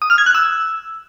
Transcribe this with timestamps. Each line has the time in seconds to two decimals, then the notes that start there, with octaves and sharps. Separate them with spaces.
0.02 D#6
0.10 F6
0.18 G#6
0.26 F#6
0.35 E6